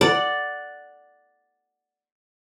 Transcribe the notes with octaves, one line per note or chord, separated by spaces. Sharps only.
D5 F#5